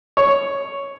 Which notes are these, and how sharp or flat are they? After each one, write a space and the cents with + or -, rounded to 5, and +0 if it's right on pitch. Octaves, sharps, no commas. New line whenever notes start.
C#5 +0